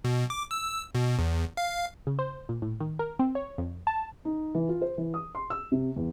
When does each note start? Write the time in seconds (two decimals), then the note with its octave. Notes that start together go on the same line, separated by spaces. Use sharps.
0.04 B2
0.30 D6
0.51 E6
0.95 B2
1.19 E2
1.57 F5
2.07 C#3
2.19 C5
2.49 A#2
2.62 A2
2.80 D#3
2.99 A#4
3.19 C4
3.35 C#5
3.58 F2
3.87 A5
4.25 D#4
4.54 E3
4.69 F4
4.82 C5
4.98 E3
5.14 D#6
5.35 C6
5.50 E6
5.72 C3
5.96 E2